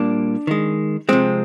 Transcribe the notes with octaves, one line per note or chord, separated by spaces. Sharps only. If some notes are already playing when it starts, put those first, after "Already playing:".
Already playing: A#2 G3 A#3 D4
D#3 G#3
C3 F3 G#3 C4